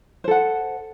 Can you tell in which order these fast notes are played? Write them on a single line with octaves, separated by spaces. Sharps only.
C5 A4 F#5